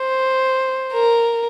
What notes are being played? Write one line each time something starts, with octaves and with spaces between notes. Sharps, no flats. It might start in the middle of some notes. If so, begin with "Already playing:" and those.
Already playing: C5
A#4